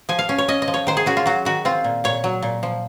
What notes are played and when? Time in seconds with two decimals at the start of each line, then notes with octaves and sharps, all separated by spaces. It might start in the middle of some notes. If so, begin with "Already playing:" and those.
0.09 F3 G#5
0.19 F5
0.29 C#4
0.38 C#5
0.48 C#4 D#5
0.62 D#5
0.68 F3
0.74 C#5
0.87 D#3 C5
0.97 G#4
1.06 C#4 F#4
1.17 F4
1.26 F#3 F#4
1.45 D#3 F#4
1.65 C4 F4
1.84 A#2
2.04 A#2 C#5
2.24 F#3
2.42 A#2
2.63 F3